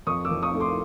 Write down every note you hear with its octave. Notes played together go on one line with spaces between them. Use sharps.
F2 C#6 D#6
D6 E6
F2
C#6 D#6
A3
C6 D6